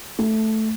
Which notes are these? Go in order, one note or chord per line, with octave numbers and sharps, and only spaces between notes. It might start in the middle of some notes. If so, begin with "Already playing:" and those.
A3